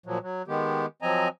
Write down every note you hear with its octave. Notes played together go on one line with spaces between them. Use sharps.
A#2 F3 F#3
F#3
D#3 G#3 B3 G4
F3 F#3 C4 D#5 G#5 A#5